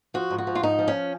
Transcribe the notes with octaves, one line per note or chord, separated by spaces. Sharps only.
F3 F#4
G#2
F#4
F3
F4
G#2 D#4
F3
C#4